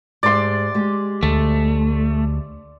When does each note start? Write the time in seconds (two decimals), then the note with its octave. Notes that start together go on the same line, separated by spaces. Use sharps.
0.23 G#2 G4 D5 E5 C6
0.75 G#3 G4
1.23 D2 A3